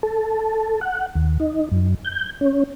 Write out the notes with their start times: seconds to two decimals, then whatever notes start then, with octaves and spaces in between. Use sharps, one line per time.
0.03 A4
0.81 F#5
1.15 D#2
1.40 D#4
1.72 F#2
2.05 G6
2.41 C#4